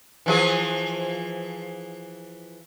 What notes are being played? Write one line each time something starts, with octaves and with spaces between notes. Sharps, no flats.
E3 F3 G#4